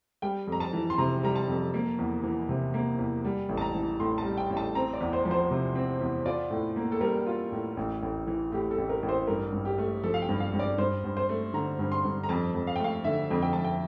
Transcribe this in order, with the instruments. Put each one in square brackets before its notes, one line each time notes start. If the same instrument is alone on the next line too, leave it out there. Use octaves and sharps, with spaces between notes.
[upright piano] G3 G5
F2
A#5
A5
E3
C6
C3 A#5
G3 A#5
A5
F2
A#3
E2
E3
C3
A#3
E2
G3
A1
A5
A#5
E3
A2 C6
A5
G3
G5
A1
A5
C4 A#5
D5
E2
C5
F3
C5
C3
C4
E2
F4 D5
A2
A#3
A4
G3 A#4
F4
A2
A1
A1
E3
A2 G4
A4
A1
A#4
A1
C5
G2 A#4
G2
G4
A3
F3 A4
F5
G5
G2
F5
G2
D5
G2 C5
G2
C5
A3
D3 A#5
G2
C6
G2
A#5
F2 A5
F2
F5
G5
A3 F5
D3 E5
F2
G5
F2 A5
G5